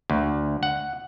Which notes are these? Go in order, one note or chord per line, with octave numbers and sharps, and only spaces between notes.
D2
F#5